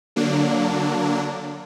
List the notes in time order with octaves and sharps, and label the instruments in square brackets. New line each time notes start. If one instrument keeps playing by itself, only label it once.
[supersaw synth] D3 F#3 A#3 D4